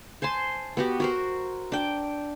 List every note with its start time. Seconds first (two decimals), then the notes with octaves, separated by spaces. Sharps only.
0.22 C5 G#5 A5 C6
0.77 B3 F#4 G4
1.00 F#4 A#4 C5
1.72 D4 G5